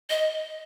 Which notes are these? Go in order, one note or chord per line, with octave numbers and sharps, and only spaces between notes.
D#5